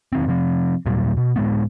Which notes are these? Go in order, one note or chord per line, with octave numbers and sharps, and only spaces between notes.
E1 D#3 C4
C3 F3 C4
D#2 A#2 F#3 G3
B2
A2 G#3 B3